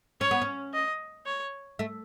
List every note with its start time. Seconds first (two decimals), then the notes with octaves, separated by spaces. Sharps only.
0.21 C#4 C#5
0.31 B3
0.42 C#4
0.74 D#5
1.26 C#5
1.79 A3